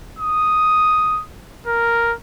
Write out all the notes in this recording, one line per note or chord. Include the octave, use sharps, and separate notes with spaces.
D#6
A#4